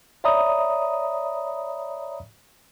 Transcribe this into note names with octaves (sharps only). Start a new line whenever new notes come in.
C#5 D5 E5 A#5 B5 D#6